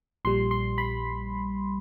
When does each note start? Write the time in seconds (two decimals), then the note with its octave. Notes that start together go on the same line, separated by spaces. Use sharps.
0.25 A#1 A#2 G3 C6
0.51 C6
0.78 B5